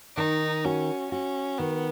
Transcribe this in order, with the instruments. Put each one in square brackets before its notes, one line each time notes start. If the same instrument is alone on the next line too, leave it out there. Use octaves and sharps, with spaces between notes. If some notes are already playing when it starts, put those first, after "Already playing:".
[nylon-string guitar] D#3 [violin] D#4
[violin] C#4 [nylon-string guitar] F#4
[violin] C#4 [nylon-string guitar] F#4
[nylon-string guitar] D#3 [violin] B3